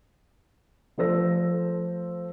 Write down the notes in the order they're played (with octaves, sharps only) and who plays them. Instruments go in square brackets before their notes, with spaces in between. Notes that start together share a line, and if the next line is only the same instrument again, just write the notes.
[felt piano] F3 A3 A4 C5 E6 A#6